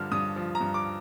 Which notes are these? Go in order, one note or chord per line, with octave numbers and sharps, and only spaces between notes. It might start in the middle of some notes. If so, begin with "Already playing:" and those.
Already playing: G2 D3 F3 F6
G2 D#6
F3
A#5
G2
D6